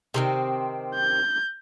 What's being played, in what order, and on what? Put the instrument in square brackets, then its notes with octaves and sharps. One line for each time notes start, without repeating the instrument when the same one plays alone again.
[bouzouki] C3 D#3 C4
[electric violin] G6